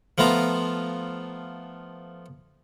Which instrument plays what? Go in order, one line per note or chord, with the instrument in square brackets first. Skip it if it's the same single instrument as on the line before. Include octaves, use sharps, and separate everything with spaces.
[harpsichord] F3 A3 B3 F4 A#5